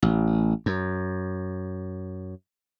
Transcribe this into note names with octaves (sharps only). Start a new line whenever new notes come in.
A1
F#2